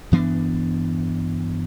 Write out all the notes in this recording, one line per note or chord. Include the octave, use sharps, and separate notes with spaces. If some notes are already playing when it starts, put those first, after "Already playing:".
G2 E3 B3 D4